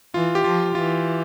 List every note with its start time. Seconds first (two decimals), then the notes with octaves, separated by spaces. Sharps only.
0.14 E3 F4
0.35 G4
0.44 F3 F4
0.75 E3 F4